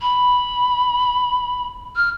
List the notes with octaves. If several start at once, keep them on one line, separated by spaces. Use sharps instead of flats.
B5
F6